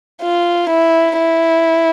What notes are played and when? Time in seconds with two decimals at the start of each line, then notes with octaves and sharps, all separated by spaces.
0.22 F4
0.69 E4
1.18 E4